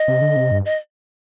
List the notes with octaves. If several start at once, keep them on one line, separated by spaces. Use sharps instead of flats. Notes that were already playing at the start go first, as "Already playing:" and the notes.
Already playing: D#5
C3
D3
C3
G2
D#5